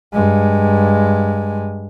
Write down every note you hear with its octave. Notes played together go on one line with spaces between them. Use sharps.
G2 G#3